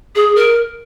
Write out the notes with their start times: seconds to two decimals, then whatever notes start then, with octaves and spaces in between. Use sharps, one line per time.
0.15 G#4
0.35 A#4